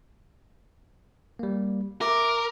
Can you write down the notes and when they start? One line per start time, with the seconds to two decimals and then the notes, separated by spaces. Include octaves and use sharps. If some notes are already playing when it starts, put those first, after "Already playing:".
1.39 G3 A#3
2.01 A#4 E5 D6